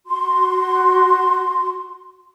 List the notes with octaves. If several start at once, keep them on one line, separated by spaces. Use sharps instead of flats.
F#4 C6